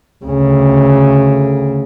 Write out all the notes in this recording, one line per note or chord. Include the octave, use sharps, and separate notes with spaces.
D2 C#3